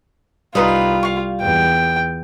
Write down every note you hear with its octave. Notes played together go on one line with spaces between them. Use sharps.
C2 G3 D#4 F4 B4 D#6
F5 C#6
E2 G5